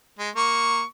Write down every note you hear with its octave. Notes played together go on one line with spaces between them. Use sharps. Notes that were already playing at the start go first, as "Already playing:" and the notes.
G#3
A#3 C#6